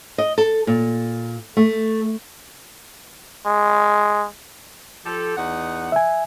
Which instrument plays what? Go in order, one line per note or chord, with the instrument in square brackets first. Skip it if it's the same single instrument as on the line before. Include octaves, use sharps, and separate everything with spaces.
[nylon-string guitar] D#5
A4
A#2
A3
[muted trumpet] G#3
[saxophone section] F3 G4 A4
E2 D#4 F#5
[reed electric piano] E5 G#5